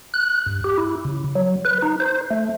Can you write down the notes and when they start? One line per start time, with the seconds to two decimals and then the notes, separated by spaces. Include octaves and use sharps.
0.14 F#6
0.46 G2
0.64 G4
0.78 E4
1.05 C#3
1.35 F#3
1.65 B4
1.82 D#4
2.00 C5
2.31 A3